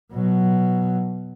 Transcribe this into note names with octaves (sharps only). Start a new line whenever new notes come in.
B2 F#3